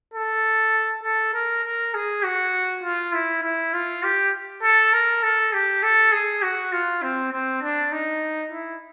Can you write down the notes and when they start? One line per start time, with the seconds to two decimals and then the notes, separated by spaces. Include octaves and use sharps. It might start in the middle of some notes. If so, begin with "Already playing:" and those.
0.14 A4
1.04 A4
1.34 A#4
1.64 A#4
1.94 G#4
2.24 F#4
2.83 F4
3.13 E4
3.44 E4
3.73 F4
4.03 G4
4.63 A4
4.93 A#4
5.23 A4
5.53 G4
5.83 A4
6.12 G#4
6.42 F#4
6.73 F4
7.02 C4
7.32 C4
7.62 D4
7.92 D#4
8.52 E4